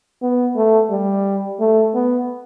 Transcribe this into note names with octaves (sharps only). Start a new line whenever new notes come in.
B3
A3
G3
A3
B3